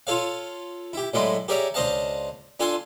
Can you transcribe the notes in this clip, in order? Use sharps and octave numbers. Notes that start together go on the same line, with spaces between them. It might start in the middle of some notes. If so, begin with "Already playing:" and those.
F4 A4 C#5 F5
E4 G4
A2 F#3 G#3 E4 D5 C6
G4 G#4 A#4 C#5 D5 E5
C#2 D4 C5 D#5 F5 A5
D4 F4 A4 G#5 C6